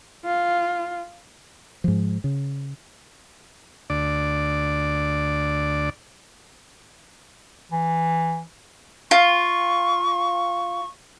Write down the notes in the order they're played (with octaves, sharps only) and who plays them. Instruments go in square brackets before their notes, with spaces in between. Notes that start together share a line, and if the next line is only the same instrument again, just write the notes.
[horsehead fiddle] F4
[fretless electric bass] G#2 F3
C#3
[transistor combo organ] D2 D5
[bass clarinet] E3
[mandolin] F4 [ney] C#6